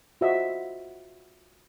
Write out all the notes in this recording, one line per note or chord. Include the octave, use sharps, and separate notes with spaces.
F4 F#4 C5 D#5 E5